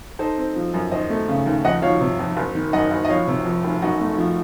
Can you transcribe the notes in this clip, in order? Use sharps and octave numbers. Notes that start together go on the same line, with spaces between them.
D#4 A4 C5
C4
F3
F#2
D#2 C5 D#5
A3
C#3
D#2
F2 D#5 F#5
F3 C#5 F5
C3
F2
F#1
D#3
F#2 D#5 F#5
F#1
D#5
F3 C#5 F5
C3
F2
F1
F#2 D#4 F#4
A3
F3